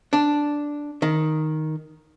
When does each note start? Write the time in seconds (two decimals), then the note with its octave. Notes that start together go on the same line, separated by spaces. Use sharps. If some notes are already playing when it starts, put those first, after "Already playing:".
0.13 D4
1.02 D#3